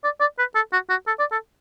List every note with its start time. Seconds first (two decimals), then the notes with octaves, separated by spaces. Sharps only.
0.04 D5
0.20 D5
0.39 B4
0.55 A4
0.73 F#4
0.90 F#4
1.07 A4
1.19 D5
1.32 A4